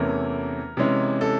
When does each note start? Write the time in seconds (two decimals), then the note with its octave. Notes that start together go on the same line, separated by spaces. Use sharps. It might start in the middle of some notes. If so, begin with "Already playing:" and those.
Already playing: E2 C3 E3 A3 C#4 A#4
0.77 C3 E3 G#3 C#4
1.21 A4